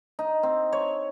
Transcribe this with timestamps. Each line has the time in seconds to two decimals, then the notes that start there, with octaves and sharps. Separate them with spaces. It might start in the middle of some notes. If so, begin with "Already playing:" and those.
0.19 D#4
0.43 C4
0.72 C#5